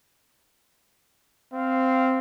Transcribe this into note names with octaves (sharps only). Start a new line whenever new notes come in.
C4 F5